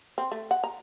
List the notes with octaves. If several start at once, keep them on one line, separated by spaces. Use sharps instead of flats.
C4
A3
F#5
A#5